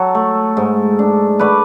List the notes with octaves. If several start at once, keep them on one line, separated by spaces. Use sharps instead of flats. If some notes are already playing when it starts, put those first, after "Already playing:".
Already playing: F#3 A4
A3
G#2
D4
A3 B4 D5